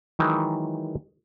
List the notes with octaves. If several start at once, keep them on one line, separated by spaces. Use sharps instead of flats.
D#3 E3 F#3 G#3 D#4